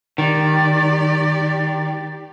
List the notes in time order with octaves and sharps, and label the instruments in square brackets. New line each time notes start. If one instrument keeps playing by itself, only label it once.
[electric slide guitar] D#3 [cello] G4 D5